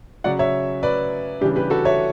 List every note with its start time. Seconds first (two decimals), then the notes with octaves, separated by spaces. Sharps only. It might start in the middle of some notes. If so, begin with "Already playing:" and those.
0.24 C#3 F#3 C#4 D5 F#5
0.39 C#5 E5
0.83 B4 D5
1.41 C#3 E3 G3 D4 G4
1.56 G4 B4
1.70 F#4 A4
1.85 C#5 E5